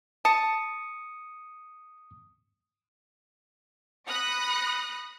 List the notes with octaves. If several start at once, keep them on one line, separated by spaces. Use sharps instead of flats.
A5 D#6 C#7
B5 D#6 F#6 A#6 C#7